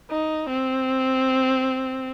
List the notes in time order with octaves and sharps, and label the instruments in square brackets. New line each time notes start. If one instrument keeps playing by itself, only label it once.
[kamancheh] D#4
C4